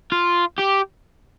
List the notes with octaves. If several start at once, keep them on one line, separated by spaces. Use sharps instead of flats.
F4
G4